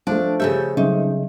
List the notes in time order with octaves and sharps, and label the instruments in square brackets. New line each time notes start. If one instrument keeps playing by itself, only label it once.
[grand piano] F3 A3 [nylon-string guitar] D4
[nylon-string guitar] C#3 A4 E5 [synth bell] G4 G6
[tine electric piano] C#3 [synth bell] F#3 G3 [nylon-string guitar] D#4